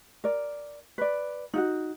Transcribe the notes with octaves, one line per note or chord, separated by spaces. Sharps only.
A#4 D5
B4 D5
D#4 F4 F#4